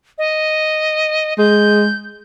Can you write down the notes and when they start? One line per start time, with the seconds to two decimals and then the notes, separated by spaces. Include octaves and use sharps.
0.18 D#5
1.38 G#3 G6